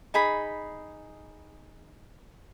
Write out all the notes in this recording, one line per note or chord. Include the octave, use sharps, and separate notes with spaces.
D#4 G#4 B5